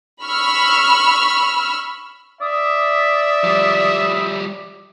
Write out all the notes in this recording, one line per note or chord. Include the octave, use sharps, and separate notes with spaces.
B5 C#6 E6 F6
D5 E5 D#6
F3 G3